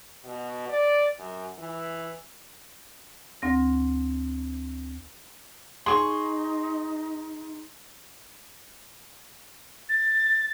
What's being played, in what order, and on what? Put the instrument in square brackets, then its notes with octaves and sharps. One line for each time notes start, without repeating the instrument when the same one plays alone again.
[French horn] B2
D5
F#2
E3
[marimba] D2 C4 A#6
[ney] D#4 [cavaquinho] G#4 C#6 [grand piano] C6
[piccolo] A6